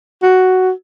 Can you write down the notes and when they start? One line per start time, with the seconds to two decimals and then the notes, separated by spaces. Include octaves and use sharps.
0.22 F#4